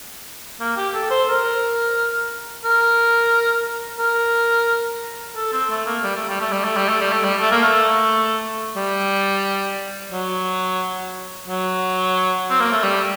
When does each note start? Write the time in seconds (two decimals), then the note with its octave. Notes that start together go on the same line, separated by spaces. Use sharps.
0.61 A#3
0.77 G4
0.94 A4
1.11 C5
1.29 A#4
2.65 A#4
4.00 A#4
5.36 A4
5.53 C4
5.71 A3
5.87 A#3
6.04 G3
6.17 A3
6.29 G3
6.41 A3
6.53 G3
6.65 A3
6.77 G3
6.89 A3
7.01 G3
7.13 A3
7.25 G3
7.40 A3
7.51 A#3
7.63 A3
8.76 G3
10.12 F#3
11.48 F#3
12.50 C4
12.60 A#3
12.72 A3
12.84 G3